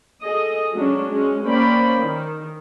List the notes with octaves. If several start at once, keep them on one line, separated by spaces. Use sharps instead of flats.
G#4 A4 D#5
F#3 G#3 C#4 D4
G#3 C#4
A#3 C#4 C5 D5 G5 B5
D#3